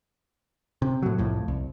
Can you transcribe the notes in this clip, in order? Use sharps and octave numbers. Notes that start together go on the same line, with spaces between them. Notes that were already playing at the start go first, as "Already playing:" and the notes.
C3
A2 F#3
C2 F2 A2
C2